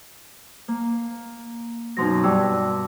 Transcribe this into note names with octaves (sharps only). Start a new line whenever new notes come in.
A#3
F#2 B2 F#3 D#4 C6 A#6
G2 D5 G5 E6